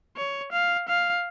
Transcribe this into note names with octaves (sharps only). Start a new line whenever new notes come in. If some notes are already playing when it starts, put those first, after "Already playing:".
C#5
F5
F5